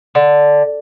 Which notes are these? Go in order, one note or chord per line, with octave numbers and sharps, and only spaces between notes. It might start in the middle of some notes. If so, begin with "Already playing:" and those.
D3